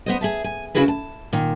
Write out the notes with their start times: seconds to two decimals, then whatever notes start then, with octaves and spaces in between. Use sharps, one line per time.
0.06 B3 C5 D#5
0.21 G#4 E5 A5
0.44 G#5
0.74 C#3 F#3 E4 F#4 G#4 B4
0.88 A5
1.33 A#2 D#3